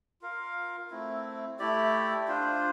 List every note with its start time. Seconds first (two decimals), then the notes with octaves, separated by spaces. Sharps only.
0.21 F4 A#4 F5
0.90 A3 C4 E4
1.59 A3 E4 G4 D5
2.28 D4 F4 C5